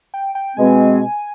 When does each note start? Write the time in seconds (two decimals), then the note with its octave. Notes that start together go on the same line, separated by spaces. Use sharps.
0.14 G5
0.35 G5
0.56 B2 G#3 C4 G#5